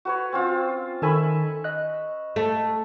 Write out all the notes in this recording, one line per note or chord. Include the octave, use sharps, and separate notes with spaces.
F#4 B4 C#5
C4 C#4 F4
D#3 A4 E5 G#5 B5 C#6
D#5 F#6
A3